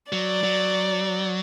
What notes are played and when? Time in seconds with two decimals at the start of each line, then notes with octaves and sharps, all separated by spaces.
0.12 F#3 D5
0.43 F#3